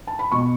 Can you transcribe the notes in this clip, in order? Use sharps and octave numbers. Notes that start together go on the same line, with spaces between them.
A5
B5
B2 C#6